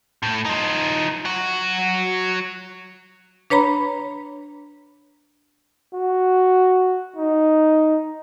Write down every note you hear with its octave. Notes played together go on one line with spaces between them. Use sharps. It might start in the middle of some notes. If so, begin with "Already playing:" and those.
A2
F3 D#4
F#3 F#4
D4 B4 C#5 A#5 B5
F#4
D#4